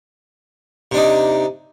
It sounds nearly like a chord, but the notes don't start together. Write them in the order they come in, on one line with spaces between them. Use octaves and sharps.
C3 D4 D#4